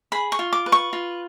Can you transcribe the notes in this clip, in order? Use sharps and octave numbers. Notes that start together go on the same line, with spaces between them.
G#4 B5
C#6
F4
D6
B4
C#6
F4